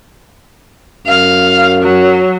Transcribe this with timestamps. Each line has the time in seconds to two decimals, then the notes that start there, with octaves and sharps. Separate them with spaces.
1.07 F#2 F5
1.83 F#3